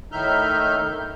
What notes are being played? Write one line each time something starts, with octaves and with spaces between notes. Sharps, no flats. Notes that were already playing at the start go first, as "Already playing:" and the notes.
A2 D#3 D#4 E5 F6 G6